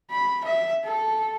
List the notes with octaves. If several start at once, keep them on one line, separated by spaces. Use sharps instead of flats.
B5
E5
A4